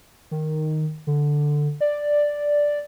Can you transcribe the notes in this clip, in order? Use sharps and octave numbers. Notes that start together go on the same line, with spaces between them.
D#3
D3
D5